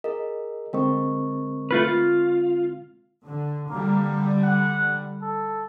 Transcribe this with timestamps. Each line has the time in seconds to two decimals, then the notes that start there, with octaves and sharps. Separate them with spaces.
0.04 G#4 A#4 D#5
0.73 D3 G#3 C4 A#4 D#5 C#6
1.71 A3 F4 B4
1.85 F4
3.25 D3
3.70 D3 G3 A#3
4.43 F#5
5.22 A4